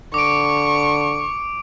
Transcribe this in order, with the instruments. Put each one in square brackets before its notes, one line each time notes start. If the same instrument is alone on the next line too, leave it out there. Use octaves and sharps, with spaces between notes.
[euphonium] D3 [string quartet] C#6 [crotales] D6 D7